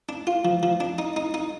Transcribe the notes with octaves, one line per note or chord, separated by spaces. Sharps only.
D4
F4
F3
F3
D4
D#4
D#4
D#4